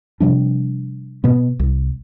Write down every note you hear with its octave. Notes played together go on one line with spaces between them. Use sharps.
C3 F3 G3 D4
B2 B3
C2